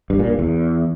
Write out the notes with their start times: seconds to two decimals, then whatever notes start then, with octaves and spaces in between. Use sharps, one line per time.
0.10 G2
0.20 A#2
0.29 G2
0.39 E2